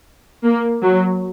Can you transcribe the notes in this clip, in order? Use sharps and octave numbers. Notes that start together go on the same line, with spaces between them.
A#3
F#3